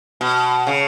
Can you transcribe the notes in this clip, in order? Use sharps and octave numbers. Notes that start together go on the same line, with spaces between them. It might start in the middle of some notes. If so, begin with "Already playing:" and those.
B2
C#3